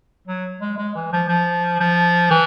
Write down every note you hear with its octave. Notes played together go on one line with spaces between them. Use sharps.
F#3
G#3
G#3
E3
F3
F3
F3
E3